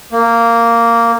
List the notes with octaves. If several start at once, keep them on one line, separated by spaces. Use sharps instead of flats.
A#3